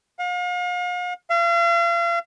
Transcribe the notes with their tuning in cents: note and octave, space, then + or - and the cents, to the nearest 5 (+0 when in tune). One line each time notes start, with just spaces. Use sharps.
F5 +40
F5 -40